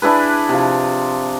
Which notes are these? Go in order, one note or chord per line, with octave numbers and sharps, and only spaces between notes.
D4 E4 G#4 B4
C3 F3